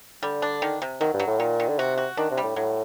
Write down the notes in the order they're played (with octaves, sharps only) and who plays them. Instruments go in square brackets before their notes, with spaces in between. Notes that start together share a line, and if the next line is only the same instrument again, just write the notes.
[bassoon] D3 [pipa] G3
[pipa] D4
D#3
C3
[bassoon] D#3 [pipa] F#3
[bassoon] G2
[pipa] F#3
[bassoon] A2
[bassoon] A#2 [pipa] D#3
[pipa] D#3
[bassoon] D3
[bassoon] C3 [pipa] F#4
[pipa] F#4
[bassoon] D#3 [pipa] D4
[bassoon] C3
[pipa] G3
[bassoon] A2
[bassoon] A2 [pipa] F#3